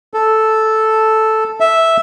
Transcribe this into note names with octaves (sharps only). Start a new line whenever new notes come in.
A4
E5